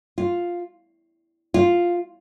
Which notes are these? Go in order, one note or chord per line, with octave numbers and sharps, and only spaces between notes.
F4
F4